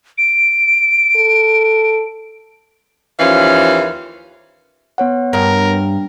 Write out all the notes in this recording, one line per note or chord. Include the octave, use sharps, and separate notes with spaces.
D7
A4
D#2 E3 F3 C#4 F5
B3 C#5 F#5
G2 A#4